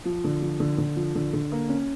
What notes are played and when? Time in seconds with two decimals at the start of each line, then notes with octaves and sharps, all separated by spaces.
0.05 F3
0.24 D3
0.42 F3
0.60 D3
0.78 D3
0.96 F3
1.15 D3
1.33 D3
1.52 A#3
1.69 C#4